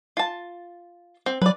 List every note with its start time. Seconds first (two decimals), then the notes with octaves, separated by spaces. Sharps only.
0.17 F4 A5
1.26 C4
1.42 F#3 B4 D5